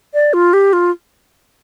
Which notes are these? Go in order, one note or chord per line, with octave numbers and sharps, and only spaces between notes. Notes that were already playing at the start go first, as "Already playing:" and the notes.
D5
F4
G4
F4